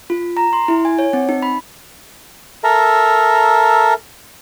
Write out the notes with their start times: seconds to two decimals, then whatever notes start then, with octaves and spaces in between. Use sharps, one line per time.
0.10 F4
0.37 A#5
0.53 C6
0.68 E4
0.85 G#5
0.99 C#5
1.13 C4
1.29 D#4
1.42 B5
2.64 A4 A#4 E5 A#5